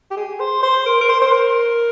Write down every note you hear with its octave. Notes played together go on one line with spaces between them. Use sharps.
G4
G#4
C5
C5
A#4
A#4
C5
C5
A#4